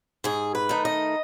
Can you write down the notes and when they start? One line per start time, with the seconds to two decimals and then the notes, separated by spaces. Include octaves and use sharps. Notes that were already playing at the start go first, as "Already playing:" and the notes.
0.24 G#2 G#4
0.55 B4
0.69 D#3 A3 D#4
0.85 D#5